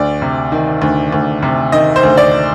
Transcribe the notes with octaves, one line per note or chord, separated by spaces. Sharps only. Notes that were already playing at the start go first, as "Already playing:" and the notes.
Already playing: D2 D5
C3
D#3
D2
D2
C3
D#3 D#5
C5
D2
D5